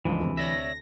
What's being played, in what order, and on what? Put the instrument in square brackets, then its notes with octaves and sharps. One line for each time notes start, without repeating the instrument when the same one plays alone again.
[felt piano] G1 C#2 [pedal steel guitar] E3 [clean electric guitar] F3 G#3
[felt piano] D2 C3
[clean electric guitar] C#5 D5 E5 [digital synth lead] A#6